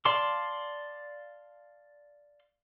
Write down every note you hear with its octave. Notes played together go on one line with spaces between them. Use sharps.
D5 F5 A5 C6 D6